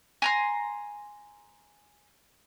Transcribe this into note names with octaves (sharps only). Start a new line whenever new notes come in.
G#5 A#5 C6